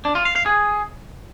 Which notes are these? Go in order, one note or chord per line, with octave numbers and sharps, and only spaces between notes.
D4
F4
F5
F5
G#4